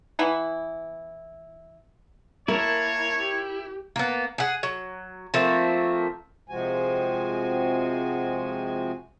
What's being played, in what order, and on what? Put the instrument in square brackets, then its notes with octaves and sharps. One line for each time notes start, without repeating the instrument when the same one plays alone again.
[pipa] E3 B3 E4
[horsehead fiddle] A#3 A5 [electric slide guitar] E4 [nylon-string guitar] A#4 [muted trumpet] C#5
[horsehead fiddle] G4
[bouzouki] A#3 B3
G#4 F#5
F#3
F3 A3 A#3 C4
[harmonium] C3 F3 G#3 C4 F#4 G#5